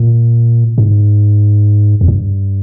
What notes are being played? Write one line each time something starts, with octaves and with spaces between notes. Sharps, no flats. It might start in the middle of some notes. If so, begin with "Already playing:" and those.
Already playing: A#2
G#2
E2
G2